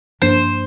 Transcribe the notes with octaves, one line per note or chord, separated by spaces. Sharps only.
G2 F3 A#3 D4 C5